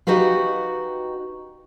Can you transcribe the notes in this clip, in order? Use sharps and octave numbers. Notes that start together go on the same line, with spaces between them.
D#4 F#4 G4 B4 F5